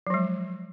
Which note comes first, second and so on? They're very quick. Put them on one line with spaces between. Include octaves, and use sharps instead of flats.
F#3 F3 G#3